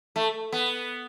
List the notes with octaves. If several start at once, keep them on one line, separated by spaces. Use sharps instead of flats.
A3
B3